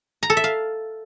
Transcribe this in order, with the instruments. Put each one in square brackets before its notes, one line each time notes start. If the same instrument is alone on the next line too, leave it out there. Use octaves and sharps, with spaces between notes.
[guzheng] A#5
A4
E5
F5